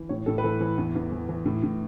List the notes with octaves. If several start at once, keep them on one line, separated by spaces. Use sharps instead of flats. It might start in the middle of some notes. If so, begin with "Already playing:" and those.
Already playing: E3
A2 C#5
A2 A4
B4
E3 A4
E3
E2
E2
E3
E3
A2
A2